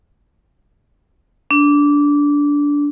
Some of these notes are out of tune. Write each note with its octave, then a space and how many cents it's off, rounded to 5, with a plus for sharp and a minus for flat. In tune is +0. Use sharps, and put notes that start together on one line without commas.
D4 -15